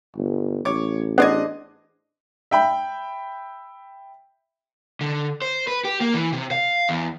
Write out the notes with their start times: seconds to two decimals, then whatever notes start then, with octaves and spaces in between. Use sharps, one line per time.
0.16 G1
0.65 A1 C#5 D6
1.18 B3 D4 G#4 C5 D5 D#5 F#6 G#6
2.51 E5 G5 B5
5.01 D3
5.42 C5
5.67 B4
5.85 G4
6.01 A#3
6.14 E3
6.33 C3
6.51 F5
6.89 E2